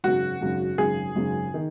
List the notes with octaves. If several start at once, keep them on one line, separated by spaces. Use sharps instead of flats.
G#1 F#2 C#3 F#4
G#1 F#2 C#3
G#1 F#2 C#3 G#4
G#1 F#2 C#3
D#3